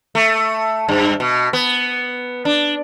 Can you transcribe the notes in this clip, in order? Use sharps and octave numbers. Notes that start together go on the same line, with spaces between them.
A3
G2
B2
B3
D4